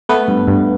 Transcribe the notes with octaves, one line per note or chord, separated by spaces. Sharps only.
A3 B3 B4
G2
G2